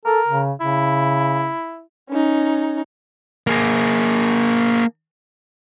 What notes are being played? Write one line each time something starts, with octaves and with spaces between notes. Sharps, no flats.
A4 A#4
C#3
C#3 E4
C#4 D#4
A#3 G#4